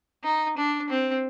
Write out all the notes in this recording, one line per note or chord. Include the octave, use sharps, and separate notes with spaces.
D#4
D4
C4